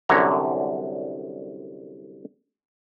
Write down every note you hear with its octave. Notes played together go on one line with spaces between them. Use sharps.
C2 F#2 D3 C#5 A#5